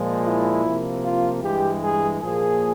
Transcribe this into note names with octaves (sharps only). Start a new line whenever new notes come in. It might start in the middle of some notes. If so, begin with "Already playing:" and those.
Already playing: A#2 F3 G#3
E4
C3 F3 A#3
F4
G2 E3 G#3 G4
G#4
A#2 F3 A#3 G#4